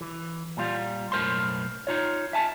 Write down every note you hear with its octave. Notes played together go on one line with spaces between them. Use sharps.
E3
A#2 G3 F4
B1 F#2 A2 A#4 C5 C6
D#4 F4 C#5
E5 G#5 A5